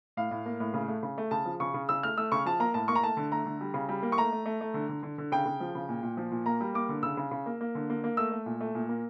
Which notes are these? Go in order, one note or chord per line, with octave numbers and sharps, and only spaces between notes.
A2 F5
A2
A#3
A2
C#3
A3
C#3
A3
C#3 A5
F3
C#3 C#6
C#3
C#3 E6
A3 F6
A3 E6
C#3 C#6
F3 A5
A#3 A#5
A2 A5
A#3 C#6
A#5
A3 A5
D3
A3 A#5
D3
G3
C#3
G3
A#3
C#6
A3 A#5
A3
A3
A3
D3
D3
D3
D3
C#3 G5
C#3
F3
C#3
A#2
A#2
F3
A#2
A#3 A#5
G3
A#3 D6
D3
C#3 E6
C#3
C#3
A#3
A#3
D3
A#3
A#3
A3 E6
A3
A#2
A3
A#2
A#3